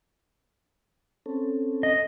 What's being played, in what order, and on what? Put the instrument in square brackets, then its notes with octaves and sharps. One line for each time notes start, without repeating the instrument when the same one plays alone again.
[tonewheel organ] C4 C#4 A4
[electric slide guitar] D#5